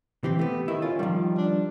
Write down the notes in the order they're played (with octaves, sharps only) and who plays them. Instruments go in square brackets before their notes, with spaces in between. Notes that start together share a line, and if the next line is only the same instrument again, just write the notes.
[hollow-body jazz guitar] E3 C4 [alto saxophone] G4
[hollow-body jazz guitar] A3 B3
[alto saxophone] D#3 [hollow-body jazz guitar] E4
[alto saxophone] C#4 [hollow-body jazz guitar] F4
[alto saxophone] D#3 [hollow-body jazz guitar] F3 G3
[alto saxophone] D4